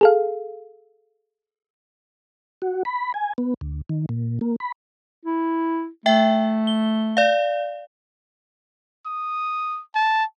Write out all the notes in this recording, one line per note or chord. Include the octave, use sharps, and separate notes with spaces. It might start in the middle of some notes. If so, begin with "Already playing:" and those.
G#4 A4 F5
F#4
B5
G#5
B3
D2
D#3
A#2
A#3
B5
E4
A3 E5 G5
G7
D5 F5
D#6
A5